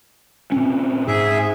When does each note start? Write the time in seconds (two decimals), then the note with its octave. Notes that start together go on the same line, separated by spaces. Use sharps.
0.52 A#2 C4 C#4
1.08 G#2 G#4 E5